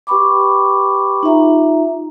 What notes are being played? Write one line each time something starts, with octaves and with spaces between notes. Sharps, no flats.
G4 B4 G5 B5 C#6 D6
D#4 F4 E5 A#5